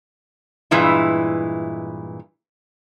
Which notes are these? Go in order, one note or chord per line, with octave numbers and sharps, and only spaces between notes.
G2 A#2 E3 G#3 E4